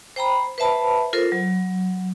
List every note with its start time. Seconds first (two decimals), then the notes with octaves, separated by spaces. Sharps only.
0.16 C5 G5 A#5 B5
0.58 B4 C5 E5 A5 B5
1.13 F4 A4 A#4 C5
1.32 F#3